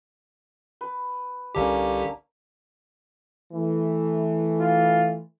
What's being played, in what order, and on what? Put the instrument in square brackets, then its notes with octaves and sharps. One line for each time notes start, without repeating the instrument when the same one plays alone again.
[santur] B4
[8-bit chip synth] C2 D3 G4 [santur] A#3 C#4 D4
[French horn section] E3 A3
[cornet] F4